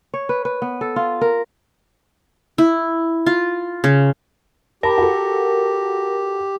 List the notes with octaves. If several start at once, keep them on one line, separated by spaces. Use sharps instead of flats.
C#5
B4
B4
B3
A4
F4
A#4
E4
F4
C#3
G4 A#4 A5 B5
F#4 A4